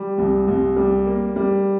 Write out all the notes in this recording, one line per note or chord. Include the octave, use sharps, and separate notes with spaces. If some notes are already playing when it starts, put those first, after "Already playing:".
Already playing: G3
C2
C2
G3
A#3
G3